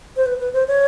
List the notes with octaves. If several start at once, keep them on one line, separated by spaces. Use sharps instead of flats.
C5
B4
B4
C5
C#5